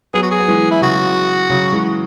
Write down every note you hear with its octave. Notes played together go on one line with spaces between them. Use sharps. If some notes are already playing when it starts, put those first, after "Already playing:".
F#3 B3 G#4
F#4
G#4
B3
E3 G#3
E4
C#3 F#3 F#4
C#3 F#3
E3 G#3